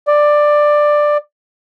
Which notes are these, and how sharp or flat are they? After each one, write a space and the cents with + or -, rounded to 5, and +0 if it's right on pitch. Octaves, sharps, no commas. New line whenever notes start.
D5 +10